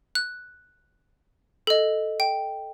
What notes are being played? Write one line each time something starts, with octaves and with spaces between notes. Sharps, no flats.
F#6
A4 D#5
G5